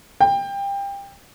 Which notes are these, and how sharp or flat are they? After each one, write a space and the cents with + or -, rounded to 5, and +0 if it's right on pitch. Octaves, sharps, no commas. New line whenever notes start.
G5 +25